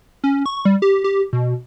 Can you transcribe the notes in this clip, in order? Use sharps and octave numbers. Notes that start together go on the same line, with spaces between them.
C#4
C#6
G3
G4
G4
B2